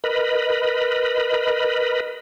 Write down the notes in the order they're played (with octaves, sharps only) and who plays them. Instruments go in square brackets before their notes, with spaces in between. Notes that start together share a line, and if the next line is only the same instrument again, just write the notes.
[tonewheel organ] A#4 B4 D#5 B5